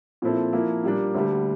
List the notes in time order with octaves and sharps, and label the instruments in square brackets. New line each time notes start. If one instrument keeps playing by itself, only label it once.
[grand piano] A#2 F3 C4 E4 A4
F3 A#3 E4
A#2 G3 A#3 D4
D2 D3 G3